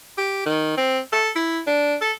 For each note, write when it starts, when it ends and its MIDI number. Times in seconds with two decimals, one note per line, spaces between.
0.18 0.45 67
0.46 0.74 51
0.77 0.99 60
1.12 1.30 69
1.35 1.61 64
1.67 1.96 62
2.01 2.12 69